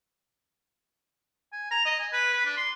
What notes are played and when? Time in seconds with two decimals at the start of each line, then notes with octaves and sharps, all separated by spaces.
1.53 G#5
1.71 A#5
1.86 D#5
1.99 G#5
2.13 B4
2.33 B4
2.45 D4
2.57 C6